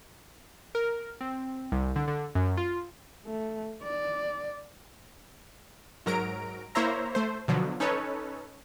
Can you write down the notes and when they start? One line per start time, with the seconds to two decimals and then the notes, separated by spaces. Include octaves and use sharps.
0.75 A#4
1.21 C4
1.72 C2
1.96 D3
2.08 D3
2.35 F#2
2.57 F4
3.26 A3
3.83 D5
6.06 G#2 F#3 A#4 A#5 D7
6.75 A#3 E4 C5 C#5 E5 A#5
7.15 A3 C5
7.48 B2 D3 F3 F#3
7.80 C#4 D#4 A4 B4 C#5